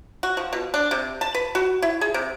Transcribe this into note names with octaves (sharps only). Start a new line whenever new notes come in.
F#4
F3
B2
D4
C3
A5
B4
F#4
E4
G#4
C3